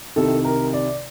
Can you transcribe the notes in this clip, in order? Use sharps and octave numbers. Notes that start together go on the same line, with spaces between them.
C2 C3 D#3 A4
A#4
D5